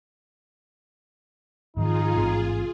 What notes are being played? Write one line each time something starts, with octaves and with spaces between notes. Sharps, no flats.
G#2 D#3 F3 D#4 F4 G#4
A1 G#2 C3